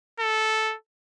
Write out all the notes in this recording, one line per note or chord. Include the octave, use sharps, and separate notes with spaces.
A4